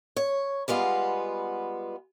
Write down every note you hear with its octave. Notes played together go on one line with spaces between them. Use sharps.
C#5
G3 G#3 B3 F4